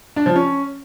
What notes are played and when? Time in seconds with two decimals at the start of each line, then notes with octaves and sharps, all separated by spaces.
0.16 D4
0.26 F3
0.36 C#4